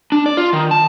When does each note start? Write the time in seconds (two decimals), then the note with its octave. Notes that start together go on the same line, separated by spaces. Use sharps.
0.12 D4
0.26 D5
0.37 F4
0.53 D#3
0.71 A5